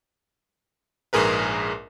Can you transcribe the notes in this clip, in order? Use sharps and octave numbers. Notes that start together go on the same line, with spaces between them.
A#1 G#2 G#4 A#4 B4